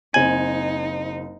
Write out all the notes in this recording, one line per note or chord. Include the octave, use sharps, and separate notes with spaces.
F#1 C4 D#4 G#5 F#7